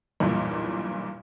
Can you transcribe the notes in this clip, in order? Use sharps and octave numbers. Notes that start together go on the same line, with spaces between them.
B1 E2 G2 A#2